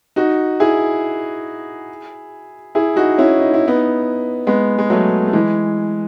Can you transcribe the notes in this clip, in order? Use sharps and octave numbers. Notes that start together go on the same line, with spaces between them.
D#4 F#4
E4 G#4
E4 G#4
D#4 F#4
C#4 E4
D#4
E4
B3 D#4
G#3 B3
G#3
F#3 A3
A3
E3 G#3